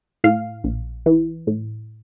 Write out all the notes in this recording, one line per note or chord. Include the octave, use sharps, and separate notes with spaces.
A2 F5
A#1
E3
A2